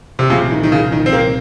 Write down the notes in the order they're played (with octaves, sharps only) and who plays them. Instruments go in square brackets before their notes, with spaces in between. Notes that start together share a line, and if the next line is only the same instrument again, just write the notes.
[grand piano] C3
[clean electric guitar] C2 A#2 F3 [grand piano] C#3
[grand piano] D#3
D#3
C#3
D#3
C4
A#3